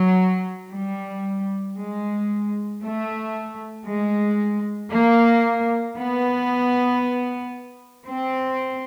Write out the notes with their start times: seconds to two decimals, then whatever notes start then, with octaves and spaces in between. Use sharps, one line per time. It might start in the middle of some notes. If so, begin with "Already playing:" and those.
Already playing: F#3
0.71 G3
1.76 G#3
2.81 A3
3.86 G#3
4.91 A#3
5.96 B3
8.05 C4